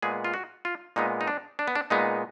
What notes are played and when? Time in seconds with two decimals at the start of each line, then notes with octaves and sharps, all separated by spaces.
0.02 A#2 G#3 B3 G#4
0.25 F4
0.34 F#4
0.65 F4
0.96 A#2 G#3 B3 D#4
1.21 D#4
1.28 D4
1.59 D4
1.68 B3
1.76 D4
1.90 A#2 G#3 B3 D#4